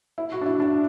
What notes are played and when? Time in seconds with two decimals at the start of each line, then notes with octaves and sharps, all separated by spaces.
0.18 E4
0.32 F#4
0.41 D4
0.46 E4
0.60 D4